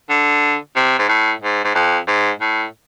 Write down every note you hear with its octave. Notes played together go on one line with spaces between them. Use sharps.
D3
C3
G#2
A2
G#2
G#2
F2
G#2
A2